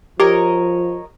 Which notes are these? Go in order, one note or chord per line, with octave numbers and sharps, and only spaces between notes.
F3 G4 A#4 C#5 D#5